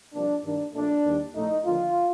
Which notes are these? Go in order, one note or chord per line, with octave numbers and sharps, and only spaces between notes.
C2 C3 F3 A#3 D4
G2 D#3 A#3 D4
A#1 A#2 A3 D4
D#2 D#3 G3
A#1 A2 A3 D#4
D#2 D3 F3 A#3 F4